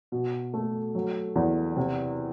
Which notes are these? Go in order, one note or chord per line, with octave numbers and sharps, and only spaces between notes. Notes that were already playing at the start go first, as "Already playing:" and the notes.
B2
A3
F#3
E2
C3